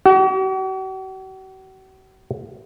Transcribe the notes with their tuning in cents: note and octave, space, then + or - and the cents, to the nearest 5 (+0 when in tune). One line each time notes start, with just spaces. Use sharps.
F#4 +45